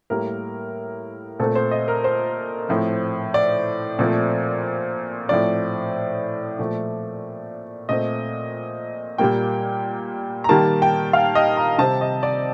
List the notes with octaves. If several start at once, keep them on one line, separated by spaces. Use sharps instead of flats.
A2 G3 A#3 A#4
A#2 A3 C4 A4
C5
D#5
A#4
C5
A2 F3 C4
D5
A#2 F3 A3 C4
A2 F3 C4 D5
A#2 F3 A3
A#2 A3 C4 D#5
A#2 G3 A#3 G5
A#5
D#3 G3 A#3 A5
G5
F5
D#5
A#5
C3 G3 C4 A5
D#5
D5